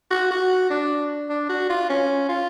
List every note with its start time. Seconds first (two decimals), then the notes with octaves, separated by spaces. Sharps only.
0.11 F#4
0.31 F#4
0.70 D4
1.30 D4
1.49 F#4
1.70 F4
1.89 C#4
2.29 F4